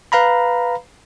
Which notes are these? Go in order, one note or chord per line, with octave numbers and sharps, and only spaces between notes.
B4 F5 A#5 B5